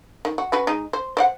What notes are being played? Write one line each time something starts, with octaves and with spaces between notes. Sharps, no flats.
D#3
F#4
C#4 F#4 B4
G#3 D#4
C5
C5 D5 F#5